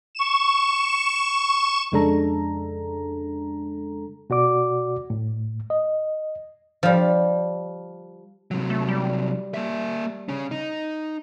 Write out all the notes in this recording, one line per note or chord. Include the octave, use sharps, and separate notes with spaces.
C#6 E7
F2 C#3 G#3 D4 A4 A#5
B2 F#4 D5 D6
A2
D#5
F3 G3
C3 F#3
A3
G3
A#3 E5
C#3 C#4
D#4